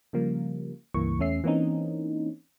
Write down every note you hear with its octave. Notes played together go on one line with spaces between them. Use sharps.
C#3 F3 G3 A#3
C#2 G2 E3 A#3 C#6
E2 A3 C#4 E5 C7
E3 A#3 C4 C#4 D#4